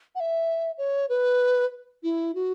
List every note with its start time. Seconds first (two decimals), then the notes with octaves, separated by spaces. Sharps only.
0.15 F#5
0.20 E5
0.78 C#5
1.09 B4
2.03 E4
2.35 F#4